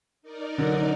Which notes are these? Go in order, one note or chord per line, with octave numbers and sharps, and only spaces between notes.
D#4 A#4 D5
D3 F#3